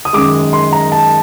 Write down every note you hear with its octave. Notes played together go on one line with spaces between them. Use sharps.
D#6
F#2 D#3 G#3 D6
C6
A#5
A5